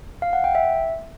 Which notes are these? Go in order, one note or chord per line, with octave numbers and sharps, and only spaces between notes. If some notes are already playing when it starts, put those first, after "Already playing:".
F5
F#5
G5
E5